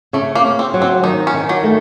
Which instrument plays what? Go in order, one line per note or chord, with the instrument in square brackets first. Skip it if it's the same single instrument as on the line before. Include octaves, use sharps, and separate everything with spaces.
[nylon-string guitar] C#3 [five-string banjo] A3
[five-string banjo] A#3
[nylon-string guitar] C#3
[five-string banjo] C4
[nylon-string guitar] F#3
[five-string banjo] C4
[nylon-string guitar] D#3 [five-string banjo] D#4
[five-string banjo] C#4
[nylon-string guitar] D#3
[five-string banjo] F#3
[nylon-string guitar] A3